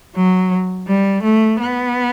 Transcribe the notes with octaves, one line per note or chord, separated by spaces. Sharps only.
F#3
G3
A3
B3